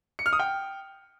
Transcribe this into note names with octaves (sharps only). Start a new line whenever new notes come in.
C#7
F6
D#6
G5